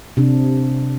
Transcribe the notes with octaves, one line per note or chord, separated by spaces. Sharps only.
C3 D4